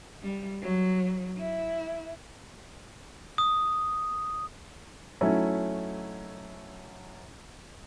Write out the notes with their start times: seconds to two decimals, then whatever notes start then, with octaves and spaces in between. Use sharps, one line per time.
0.22 G3
0.62 F#3
1.37 E4
3.38 D#6
5.21 F#3 A3 C#4 D#4 E4